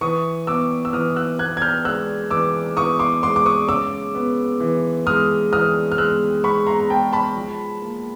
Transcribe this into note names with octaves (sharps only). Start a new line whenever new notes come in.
E3 C#6 D#6
B3 D6 E6
E6
E3 D#6 F6
E6 F#6
B3 F#6 G#6
G#6
F6 G6
G#3 E6 F#6
E3 D6 E6
E3 C#6 D#6
C6 D6
G#3 C6 D6
D6
C#6 D#6
C#3 D6 E6
B3
E3
G#3 D#6 F6
E3 D#6 F6
F6
G#3 E6 F#6
G#3 B5 C#6
A#5 C6
A#5
G#3 G5 A5
A5 B5
F3
A#3